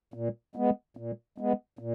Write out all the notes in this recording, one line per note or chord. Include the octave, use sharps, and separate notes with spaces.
A#2
G#3 B3
A#2
G#3 B3
A#2